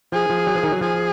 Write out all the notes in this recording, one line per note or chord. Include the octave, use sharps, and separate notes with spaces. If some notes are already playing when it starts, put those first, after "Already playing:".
F3 G#4
F3
F#3
F3
D#3
F#3
F3 G#4